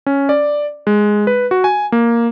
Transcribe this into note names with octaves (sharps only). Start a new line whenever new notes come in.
C#4
D5
G#3
B4
F#4
G#5
A#3